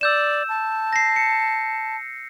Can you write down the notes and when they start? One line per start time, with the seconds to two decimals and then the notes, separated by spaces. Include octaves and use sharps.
0.01 D5 E6 G6 E7
0.49 A5
0.93 A#6 C7
1.16 C#7